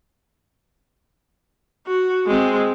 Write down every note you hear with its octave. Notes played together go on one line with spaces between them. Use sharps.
F#4
G#3 C4